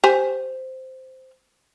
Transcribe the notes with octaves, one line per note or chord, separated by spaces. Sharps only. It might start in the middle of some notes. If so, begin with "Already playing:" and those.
G4 C5 G#5